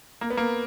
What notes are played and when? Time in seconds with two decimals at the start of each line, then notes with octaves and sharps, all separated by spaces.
0.21 A#3
0.30 B3
0.37 A#3